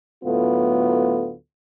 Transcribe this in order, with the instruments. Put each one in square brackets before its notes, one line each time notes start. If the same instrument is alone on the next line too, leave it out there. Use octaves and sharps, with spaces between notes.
[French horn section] D2 A2 F#3 B3 F4 A4